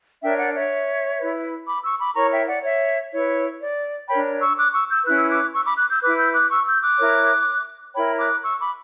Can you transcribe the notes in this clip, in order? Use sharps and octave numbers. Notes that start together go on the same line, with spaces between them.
D4 A#4 C#5 E5 G5
D5 F#5
C#5 E5
E4 B4
B5 D6
C#6 E6
B5 D6
E4 A#4 C#5 A#5 C#6
E5 G5
D5 F#5
C#5 E5
E4 B4 C#5
D5
D4 A#4 C#5 G5 B5
C#6 E6
D6 F#6
C#6 E6
E6 G6
C#4 E4 B4 F#6
E6
D6 F#6
C#6 E6
B5 D6
D6 F#6
E6 G6
E4 B4 D6 F#6
E6 G6
D6 F#6
C#6 E6
E6 G6
D6 F#6
E4 A#4 C#5
E4 A#4 C#5 G5 B5
D6 F#6
C#6 E6
B5 D6